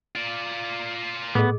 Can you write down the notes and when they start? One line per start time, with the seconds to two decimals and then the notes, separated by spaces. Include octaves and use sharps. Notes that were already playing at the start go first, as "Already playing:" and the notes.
0.15 F4 D5
1.35 A2 B3 G#4 A4 D#5